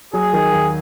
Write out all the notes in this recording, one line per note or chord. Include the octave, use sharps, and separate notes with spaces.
F#3 G#4
D#3
D#2